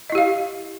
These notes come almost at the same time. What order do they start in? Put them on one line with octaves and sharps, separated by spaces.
D#5 E4 G4 F5